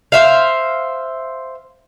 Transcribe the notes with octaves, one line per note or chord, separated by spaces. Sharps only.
C5 E5 F5